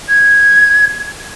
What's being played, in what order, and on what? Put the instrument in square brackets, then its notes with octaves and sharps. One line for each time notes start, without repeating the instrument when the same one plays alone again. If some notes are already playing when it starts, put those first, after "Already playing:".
[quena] G#6